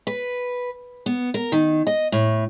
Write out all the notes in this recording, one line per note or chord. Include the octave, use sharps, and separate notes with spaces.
B4
B3
A#4
D#3
D#5
A2